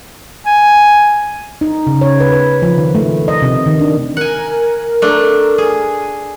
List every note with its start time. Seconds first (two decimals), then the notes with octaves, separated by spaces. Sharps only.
0.46 G#5
1.61 D#4
1.87 C#3
2.01 C#5
2.20 B4
2.32 B4
2.62 F3
2.78 D#3
2.95 A3
3.28 D#5
3.42 C3
3.66 D#3
3.79 D4
4.17 A#4 F#5 G#5
5.02 A3 D4
5.58 G#4